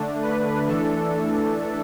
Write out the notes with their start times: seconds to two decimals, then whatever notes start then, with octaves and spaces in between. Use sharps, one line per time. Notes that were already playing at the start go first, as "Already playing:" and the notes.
Already playing: D3 A3 D4
0.22 B4
0.67 E3 A3 D4 A4